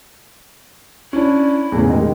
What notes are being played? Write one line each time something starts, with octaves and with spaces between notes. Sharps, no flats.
C#4 D4 E4
E2 A2 C#3
D#3 G#3 G4